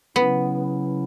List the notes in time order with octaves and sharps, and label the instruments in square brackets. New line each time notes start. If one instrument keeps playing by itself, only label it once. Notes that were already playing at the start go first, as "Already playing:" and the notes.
[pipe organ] C#3 F#3 C#4 E4 [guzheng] B3